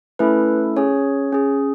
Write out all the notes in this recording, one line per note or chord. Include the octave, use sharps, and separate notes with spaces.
A3 C#4 E4 A4 B4
C#4 G#4 C#5
C#4 G#4